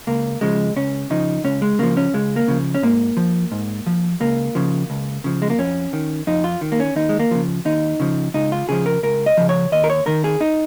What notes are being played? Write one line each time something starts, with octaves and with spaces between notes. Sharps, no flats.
C#2 A#3
C#3 F3 G#3
C#2 C#4
C#3 F3 D#4
C#2 C#4
G#3
C#3 F3 A#3
C#4
C#2 G#3
A#3
C#3 F3
C#4
G#2 A#3
F3
G#2
F3
C#2 A#3
C#3 F3
C#2
C#3 F3
G#3
A#3
F2 C#4
D#3
F2 D#4
F4
D#3
A#3
C#4
D#2 D#4
G#3
A#3
C#3 F3
D#2 D#4
C#3 F3
C#2 D#4
F4
C#3 F3 G#4
A#4
C#2 A#4
D#5
C#3 F3
C#5
D#2 D#5
A#4
C#5
D#3 A#4
G#4
D#4